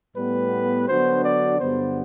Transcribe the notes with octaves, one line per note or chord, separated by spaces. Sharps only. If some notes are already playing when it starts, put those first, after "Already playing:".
A2 G3 B3 B4
D3 F#3 B3 D4 F#4 C5
D5
G2 D3 F#3 B3 C5